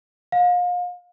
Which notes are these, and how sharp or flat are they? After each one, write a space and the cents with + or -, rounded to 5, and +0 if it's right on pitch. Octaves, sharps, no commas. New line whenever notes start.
F5 +35